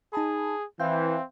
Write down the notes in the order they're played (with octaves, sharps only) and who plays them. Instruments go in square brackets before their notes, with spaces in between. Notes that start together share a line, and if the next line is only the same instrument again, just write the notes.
[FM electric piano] D#4 A5 B5 [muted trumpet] G#4
[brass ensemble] E3 [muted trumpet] C4 [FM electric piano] E5 F5 G6